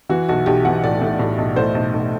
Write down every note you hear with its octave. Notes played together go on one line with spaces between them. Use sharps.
E3 F#4
B1 F#4
B1 G4
E3 F#5
A2 D5
A2
A2
B1
A2 C5
B1
B1